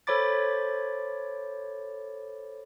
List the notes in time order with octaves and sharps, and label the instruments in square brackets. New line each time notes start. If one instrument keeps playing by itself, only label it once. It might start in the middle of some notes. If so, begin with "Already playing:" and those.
[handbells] A4 C5 C#5 B5 D6 A6